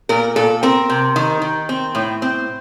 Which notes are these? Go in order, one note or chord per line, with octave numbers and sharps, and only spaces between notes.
A#2 A#4
A#2 A4
C4 A#4
C3
D#3
D#3
C4
A2
C4